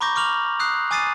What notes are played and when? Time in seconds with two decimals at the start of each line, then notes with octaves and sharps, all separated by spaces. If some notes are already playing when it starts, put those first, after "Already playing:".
0.01 A#5 B5 C#6 D6 G6 A#6
0.16 C#6 D6 F6 F7 F#7
0.59 D#6 F#6 C7
0.91 G#5 D6 D#6 A6 C7 D#7